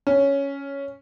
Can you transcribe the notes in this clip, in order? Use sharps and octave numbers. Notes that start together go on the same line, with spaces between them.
C#4